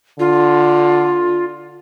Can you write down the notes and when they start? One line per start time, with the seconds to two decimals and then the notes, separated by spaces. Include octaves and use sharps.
0.19 D3 F4